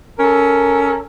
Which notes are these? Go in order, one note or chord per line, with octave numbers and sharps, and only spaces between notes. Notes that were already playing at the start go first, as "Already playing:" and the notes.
C#4 A4 A#4